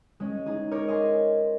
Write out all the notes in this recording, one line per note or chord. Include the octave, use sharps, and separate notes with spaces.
G#3 C#4
D#4 G#4
A#4 C#5 C#6 D6 G#6
D#5 G#5 C6